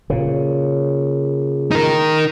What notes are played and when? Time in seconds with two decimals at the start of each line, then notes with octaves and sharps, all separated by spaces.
0.10 A#2 C#3
1.71 D#4 A#4